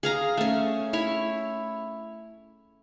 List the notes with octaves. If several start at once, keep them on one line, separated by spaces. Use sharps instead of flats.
G#4 F5 A#5
A3 C#4
E4 C#5